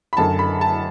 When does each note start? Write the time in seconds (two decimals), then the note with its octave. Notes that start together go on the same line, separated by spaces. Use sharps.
0.13 B5
0.17 F#1 F#2 D3 A5
0.39 B5
0.61 A5